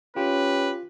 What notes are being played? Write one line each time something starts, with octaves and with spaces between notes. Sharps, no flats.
C#4 F4 G4 B4